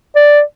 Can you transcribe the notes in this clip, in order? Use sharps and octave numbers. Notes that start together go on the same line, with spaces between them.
D5